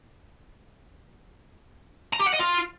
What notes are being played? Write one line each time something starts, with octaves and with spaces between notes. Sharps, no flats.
A#5
G4
F#5
D#5
F4